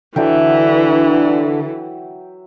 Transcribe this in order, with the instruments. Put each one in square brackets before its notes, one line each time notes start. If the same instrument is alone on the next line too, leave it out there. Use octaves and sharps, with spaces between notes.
[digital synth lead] D3 [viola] E3 [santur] F#3 E5 G5